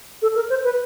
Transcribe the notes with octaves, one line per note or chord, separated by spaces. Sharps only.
A4
A#4
C5
B4